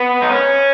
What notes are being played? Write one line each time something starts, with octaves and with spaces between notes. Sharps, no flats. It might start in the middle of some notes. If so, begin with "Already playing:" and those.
Already playing: B3
D#4
C#4